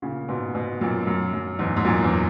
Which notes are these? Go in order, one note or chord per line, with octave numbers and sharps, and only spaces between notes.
A#2 C#3
G#2 B2
G#2 B2
F#2 A#2
F#2
F#2
E2 G#2
G#2
F#2 A#2
E2